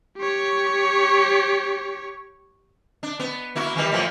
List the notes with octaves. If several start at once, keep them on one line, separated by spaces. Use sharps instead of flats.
G4 C#5
D4
B3
A#3 E4 F#4
D#3 E3 G3
A2 E3 F3